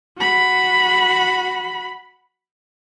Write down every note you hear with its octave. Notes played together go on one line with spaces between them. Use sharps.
F#4 B5